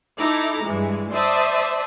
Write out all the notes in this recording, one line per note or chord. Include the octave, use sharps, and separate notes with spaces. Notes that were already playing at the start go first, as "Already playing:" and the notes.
D#4 E4 A4 A#5 D6
G2 E3 G#3
C5 D5 E5 A5 D#6